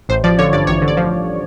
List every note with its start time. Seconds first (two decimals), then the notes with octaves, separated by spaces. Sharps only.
0.09 A1 C5
0.24 F3 D5
0.39 D3 C#5
0.53 G2 D5
0.67 A1 C#5
0.82 D3
0.88 D5
0.97 F3